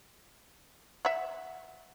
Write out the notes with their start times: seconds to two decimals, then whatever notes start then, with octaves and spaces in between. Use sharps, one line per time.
1.05 E5 F#5